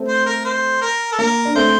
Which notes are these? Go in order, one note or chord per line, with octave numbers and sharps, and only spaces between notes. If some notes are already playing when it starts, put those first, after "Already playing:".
Already playing: A3 C4
C5
A#4
C5
A#4
A4
A#3 A#4
D4
A3 C4 C5